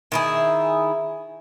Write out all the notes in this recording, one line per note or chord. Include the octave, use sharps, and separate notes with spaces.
D#3 E4 G#4